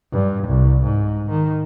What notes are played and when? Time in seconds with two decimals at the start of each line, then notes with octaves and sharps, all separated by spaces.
0.12 G2
0.48 C2
0.83 G#2
1.30 D#3